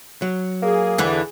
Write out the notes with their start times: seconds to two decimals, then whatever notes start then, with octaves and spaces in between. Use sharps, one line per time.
0.22 F#3
0.62 A#3 G#4
0.98 E2 D3 E3